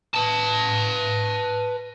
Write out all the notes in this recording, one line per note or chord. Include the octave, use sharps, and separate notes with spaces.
B4 A5